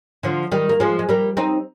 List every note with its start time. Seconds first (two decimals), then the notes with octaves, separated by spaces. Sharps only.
0.23 D3 F3
0.52 D#3 G3
0.69 A#3
0.80 F3 G#3
0.99 G#3
1.09 G3 A#3
1.37 C4 D#4